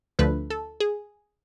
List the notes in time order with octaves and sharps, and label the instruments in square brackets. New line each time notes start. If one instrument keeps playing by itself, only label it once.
[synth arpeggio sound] D2 D3 F3 A3 B4
A4
G#4